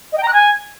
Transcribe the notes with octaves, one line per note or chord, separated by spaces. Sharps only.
D#5
G5
A#5
F#6
G#5